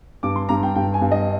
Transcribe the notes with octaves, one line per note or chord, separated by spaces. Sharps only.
G2 D6
C6
G2 A#5
G5
G2 G5
G#5
G2
D#5